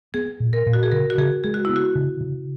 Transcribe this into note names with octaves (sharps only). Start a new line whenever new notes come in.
B3 G#4
A#2
A#4
A#2
F#4
G#4
C#3 A#4
F#4
C#3 G#4
G#3 G#4
F#4
B3 E4
F#4
C#3
C#3